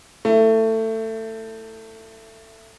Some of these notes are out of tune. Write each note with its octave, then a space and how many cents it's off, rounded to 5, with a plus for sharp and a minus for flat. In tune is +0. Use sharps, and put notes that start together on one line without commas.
A3 +20 E4 +0